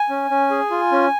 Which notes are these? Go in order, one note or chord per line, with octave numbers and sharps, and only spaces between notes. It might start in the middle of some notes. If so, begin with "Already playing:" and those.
Already playing: G#5
C#4
C#4
G#4
F4
C#4